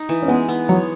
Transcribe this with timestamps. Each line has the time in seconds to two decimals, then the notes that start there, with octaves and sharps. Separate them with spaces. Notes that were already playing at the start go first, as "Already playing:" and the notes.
Already playing: D#4
0.09 E3
0.22 C#4
0.28 G#3 B3
0.48 B3
0.69 F#3 C#5